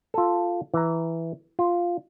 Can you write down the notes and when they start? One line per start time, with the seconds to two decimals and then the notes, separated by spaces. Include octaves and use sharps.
0.14 F4 A4
0.74 E3 A#5
1.59 F4